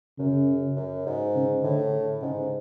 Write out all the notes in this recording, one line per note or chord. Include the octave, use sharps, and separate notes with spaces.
F#2 C#3
F#2
G#2
C#3
A2 D3
G#2 C#3